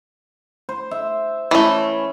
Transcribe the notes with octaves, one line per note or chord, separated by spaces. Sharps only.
C5
E5
E3 A3 C#4 B5